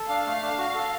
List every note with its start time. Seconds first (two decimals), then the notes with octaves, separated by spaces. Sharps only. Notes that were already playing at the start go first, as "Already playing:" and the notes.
Already playing: A4
0.09 D4 F5
0.26 A3
0.42 D4
0.58 F#4
0.75 A4